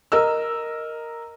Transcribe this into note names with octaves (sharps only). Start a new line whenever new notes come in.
A#4 D#5 E6